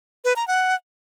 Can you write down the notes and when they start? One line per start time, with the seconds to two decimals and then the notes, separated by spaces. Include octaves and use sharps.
0.25 B4
0.36 A#5
0.47 F#5